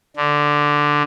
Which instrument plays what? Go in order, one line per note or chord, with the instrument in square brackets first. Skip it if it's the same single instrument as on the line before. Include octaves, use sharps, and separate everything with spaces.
[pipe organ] D3